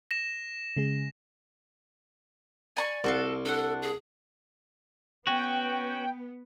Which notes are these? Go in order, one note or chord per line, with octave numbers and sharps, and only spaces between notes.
A#6 E7
C#3 G#3 G#4
D5 G#5 A#5 C#6
C2 F#4 A4 F5
D4 A4 F#5
G#4
B3 C#4 F#4 G5